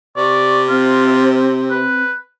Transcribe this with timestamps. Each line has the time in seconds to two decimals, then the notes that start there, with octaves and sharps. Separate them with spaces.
0.17 C3 D5 C#6
0.69 C4 F4
1.71 B4